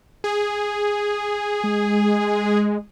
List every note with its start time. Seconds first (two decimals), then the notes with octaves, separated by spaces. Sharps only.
0.24 G#4
1.64 G#3